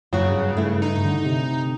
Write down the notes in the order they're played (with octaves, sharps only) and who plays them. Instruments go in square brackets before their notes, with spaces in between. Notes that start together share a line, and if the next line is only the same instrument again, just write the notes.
[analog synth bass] F#2 [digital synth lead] C#3 [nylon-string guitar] F#3 F#4
[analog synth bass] G2
[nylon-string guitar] A3 E4
[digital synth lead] D#4
[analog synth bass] D3
C3